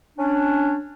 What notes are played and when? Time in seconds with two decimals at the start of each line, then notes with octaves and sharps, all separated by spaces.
0.18 C#4 D4